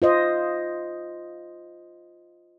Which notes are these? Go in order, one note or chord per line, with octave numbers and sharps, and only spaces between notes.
F4 C5 D#5